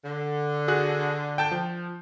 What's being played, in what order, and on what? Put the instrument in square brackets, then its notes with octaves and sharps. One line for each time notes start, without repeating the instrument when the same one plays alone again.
[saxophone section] D3
[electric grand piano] F#4 G#4 F#6
G5 A5 G6
F3